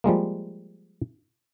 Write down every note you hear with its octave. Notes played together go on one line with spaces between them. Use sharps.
F3 G3 G#3 A#3